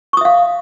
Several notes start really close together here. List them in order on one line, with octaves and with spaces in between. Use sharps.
C#6 D#6 E5 F5